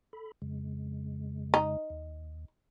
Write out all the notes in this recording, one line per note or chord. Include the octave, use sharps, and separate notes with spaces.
A4 B5
F2 C#3 G#3
D#4
D#2